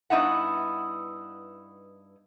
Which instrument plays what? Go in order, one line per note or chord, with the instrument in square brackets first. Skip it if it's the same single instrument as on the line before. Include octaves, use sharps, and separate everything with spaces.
[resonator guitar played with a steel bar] G2 B3 D#4 E4 F#5